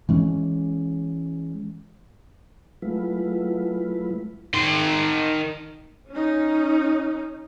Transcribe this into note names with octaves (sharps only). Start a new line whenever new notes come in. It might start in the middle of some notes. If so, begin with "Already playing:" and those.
E3 G#3 C#4
F#3 G#3 A3 E4 F4 B4
D#3 C6
C#4 D#4